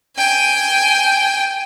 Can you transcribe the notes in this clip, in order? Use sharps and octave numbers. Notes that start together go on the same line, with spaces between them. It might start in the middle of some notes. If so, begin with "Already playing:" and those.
G5 G#5